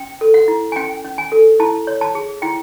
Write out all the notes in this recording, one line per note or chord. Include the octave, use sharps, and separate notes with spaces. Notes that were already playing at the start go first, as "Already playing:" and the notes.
Already playing: C#4 G5
A4
F#5
E4
G#5
C#4 G5
C#4
G#5
A4
E4 A5
C#5
A5
G#4
E4 G5